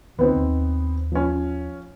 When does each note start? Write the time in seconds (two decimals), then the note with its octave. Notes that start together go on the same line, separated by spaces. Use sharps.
0.19 C#2 D3 D#3 B3 C4 D#4
0.36 D#2
1.12 F3 C#4